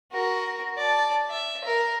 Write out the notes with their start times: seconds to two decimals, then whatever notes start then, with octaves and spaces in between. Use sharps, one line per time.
0.12 F#4 A#4
0.77 D5 A5
1.30 E5
1.65 A#4